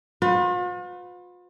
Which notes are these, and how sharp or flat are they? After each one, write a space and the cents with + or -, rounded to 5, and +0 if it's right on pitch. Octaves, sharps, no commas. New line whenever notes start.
F4 +45 B4 +35